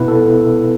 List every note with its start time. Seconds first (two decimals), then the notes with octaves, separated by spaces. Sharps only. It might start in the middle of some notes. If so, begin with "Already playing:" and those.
Already playing: B2 B3 E4 B4
0.08 A4